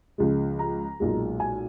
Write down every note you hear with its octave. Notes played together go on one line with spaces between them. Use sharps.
C#2 C#3 F3 G#3
A#5
B1 A#2 G#3
G#5